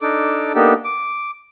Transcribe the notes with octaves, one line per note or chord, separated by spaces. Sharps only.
D4 D#4 A4 D6
A#3 B3 D4 D#4 G4 A4
D6